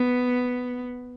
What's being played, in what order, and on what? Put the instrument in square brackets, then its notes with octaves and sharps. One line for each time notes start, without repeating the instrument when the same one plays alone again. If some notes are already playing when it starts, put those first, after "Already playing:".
Already playing: [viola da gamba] B3